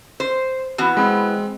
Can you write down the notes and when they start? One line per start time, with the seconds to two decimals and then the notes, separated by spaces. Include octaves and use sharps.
0.20 C5
0.78 E3 B3 F#4
0.97 G#3 C4